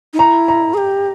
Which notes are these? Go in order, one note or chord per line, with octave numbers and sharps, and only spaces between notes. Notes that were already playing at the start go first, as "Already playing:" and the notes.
D#4
E4 A#5
A#5
G#4
G4